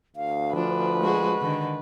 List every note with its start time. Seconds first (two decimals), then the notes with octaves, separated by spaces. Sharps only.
0.16 D2 F5
0.56 F3 D4 B4
1.01 G#3 F#4 G#4
1.41 D3 D#3